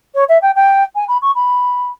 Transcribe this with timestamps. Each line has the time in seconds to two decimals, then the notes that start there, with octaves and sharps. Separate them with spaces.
0.15 C#5
0.29 E5
0.42 G5
0.56 G5
0.95 G#5
1.08 B5
1.22 C#6
1.35 B5